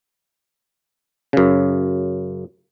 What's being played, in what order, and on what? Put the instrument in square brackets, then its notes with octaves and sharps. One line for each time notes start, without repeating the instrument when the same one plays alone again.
[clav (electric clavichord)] F#2 C#3